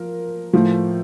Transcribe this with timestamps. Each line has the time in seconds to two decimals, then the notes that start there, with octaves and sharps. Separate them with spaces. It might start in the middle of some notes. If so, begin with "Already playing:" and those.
Already playing: F3 A#4
0.53 A2 F3